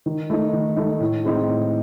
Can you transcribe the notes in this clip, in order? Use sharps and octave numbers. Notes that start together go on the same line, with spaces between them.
D#3
A3 D#4
D#3
A3 D#4
A2
G#3 C4 D#4
A2